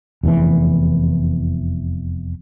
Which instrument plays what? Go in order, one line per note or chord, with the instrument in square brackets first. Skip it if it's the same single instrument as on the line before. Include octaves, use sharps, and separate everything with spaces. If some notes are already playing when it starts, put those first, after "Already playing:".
[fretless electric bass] F1 E2 B2 E3